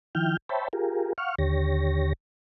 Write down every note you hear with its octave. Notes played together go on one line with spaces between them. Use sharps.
D#3 F3 E4 G5 F6 G6
C5 C#5 E5 G5 A5 B5
F4 G4 G#4 A#4
F5 F#5 C#6 F6
D#2 D3 G4 C#5 A#6